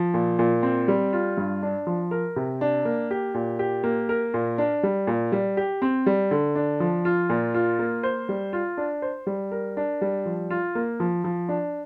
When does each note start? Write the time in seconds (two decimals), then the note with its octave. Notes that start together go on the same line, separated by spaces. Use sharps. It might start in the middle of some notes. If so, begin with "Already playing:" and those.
Already playing: F3
0.14 A#2
0.39 A#2
0.63 C4
0.88 G3
1.13 F4
1.38 G2
1.63 D4
1.87 F3
2.11 A#4
2.36 C3
2.61 D4
2.85 A#3
3.11 G4
3.34 A#2
3.59 G4
3.84 A#3
4.09 A#4
4.34 A#2
4.58 D4
4.83 G3
5.07 A#2
5.32 G3
5.57 G4
5.82 C4
6.06 G3
6.31 D3
6.55 D4
6.80 F3
7.05 F4
7.29 A#2
7.54 F4
7.79 A#3
8.03 C5
8.29 G3
8.53 F4
8.77 D4
9.02 C5
9.27 G3
9.51 A#4
9.77 D4
10.01 G3
10.26 F3
10.50 F4
10.75 A#3
11.00 F3
11.24 F3
11.49 D4